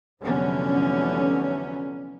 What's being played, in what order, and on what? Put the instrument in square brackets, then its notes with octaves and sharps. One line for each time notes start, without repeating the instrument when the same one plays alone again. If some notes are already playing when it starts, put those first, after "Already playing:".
[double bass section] F1 D3 E3 F#3 B3 C#4